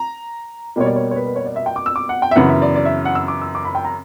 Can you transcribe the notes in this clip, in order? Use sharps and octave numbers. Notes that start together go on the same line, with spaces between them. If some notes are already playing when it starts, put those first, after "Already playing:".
Already playing: A#5
B2 G3 A#3 C#5
D5
C#5
C#5
B4
B4
C#5
D5
E5
G5
D6
E6
D6
F#5
G5
E5
F#2 C#3 E3 B3 F#5
E5
D5
D5
E5
F#5
E6
D6
E6
D6
B5
G5
A#5